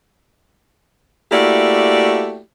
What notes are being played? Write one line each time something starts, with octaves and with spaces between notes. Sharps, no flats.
A3 A#3 E4 F#4 G4 D5